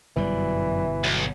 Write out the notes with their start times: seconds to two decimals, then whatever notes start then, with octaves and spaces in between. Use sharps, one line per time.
0.16 G1 F#2 B2 E3 G3 D5
1.04 B1 F#3